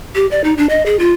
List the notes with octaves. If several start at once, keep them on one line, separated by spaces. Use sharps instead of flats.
G4
D5
D#4
D4
D#5
G#4
F4